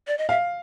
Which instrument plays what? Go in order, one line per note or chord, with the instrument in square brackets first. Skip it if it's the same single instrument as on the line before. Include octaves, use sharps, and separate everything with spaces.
[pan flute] D5
D#5
[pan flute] E5 [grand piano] F5